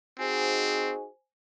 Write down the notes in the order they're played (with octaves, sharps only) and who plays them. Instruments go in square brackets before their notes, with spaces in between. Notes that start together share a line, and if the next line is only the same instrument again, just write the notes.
[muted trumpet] C4 [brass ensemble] D#4 F#4 G#4 [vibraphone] C5 G#5